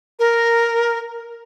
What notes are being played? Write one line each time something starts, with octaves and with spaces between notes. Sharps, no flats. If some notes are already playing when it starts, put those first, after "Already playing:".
A#4